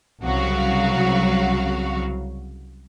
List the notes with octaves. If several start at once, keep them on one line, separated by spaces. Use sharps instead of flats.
C2 C#3 F#3 F#4 F5